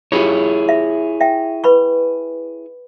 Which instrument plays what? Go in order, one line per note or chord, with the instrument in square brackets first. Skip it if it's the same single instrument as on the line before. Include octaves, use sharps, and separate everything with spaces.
[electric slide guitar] E4 G#4 C#5 [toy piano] F4 G4
[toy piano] E5
E5 G5
B4 B5 C#6